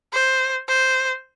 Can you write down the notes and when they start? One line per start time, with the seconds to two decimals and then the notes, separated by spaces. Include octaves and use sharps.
0.13 C5
0.68 C5